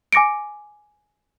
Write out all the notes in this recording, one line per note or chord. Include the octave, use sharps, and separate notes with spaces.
G#5 D6 A#6 C#7 D7